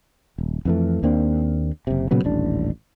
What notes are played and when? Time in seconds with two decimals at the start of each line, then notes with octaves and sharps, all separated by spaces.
0.38 D#1
0.65 F2 E3 A3
1.03 D#2 A#3 C4 D4
1.87 F#1 C3
2.11 A#2 C#3 F#3 B3
2.24 D#1 A1 D4